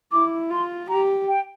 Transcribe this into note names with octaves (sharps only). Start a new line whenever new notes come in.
E4 D6
F4 C6
G4 A#5
G5